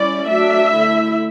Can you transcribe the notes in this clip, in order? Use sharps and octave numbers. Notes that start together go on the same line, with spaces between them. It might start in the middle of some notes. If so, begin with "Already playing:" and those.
Already playing: G3 C#4 E4 D5
F#3 A3 D4 E5
D3 A3 E4